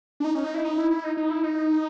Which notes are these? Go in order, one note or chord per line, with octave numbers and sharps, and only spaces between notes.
D4
D#4
C#4
D#4
E4
D#4
E4
E4
D#4
D#4
E4
D#4